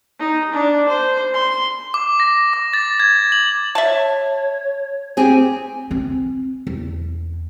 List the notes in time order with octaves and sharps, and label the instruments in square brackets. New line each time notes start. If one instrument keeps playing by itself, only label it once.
[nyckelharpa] D#4
D4
C5
C6
[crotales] D6
A#6
D6
A6
G#6
F#7
[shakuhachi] C#5 [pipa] E5 A5
[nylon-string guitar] C4 G4 G#4
[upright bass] C4
E2